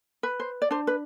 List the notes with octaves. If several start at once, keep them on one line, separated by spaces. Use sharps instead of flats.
B4
C5
D5
D4 C5
B4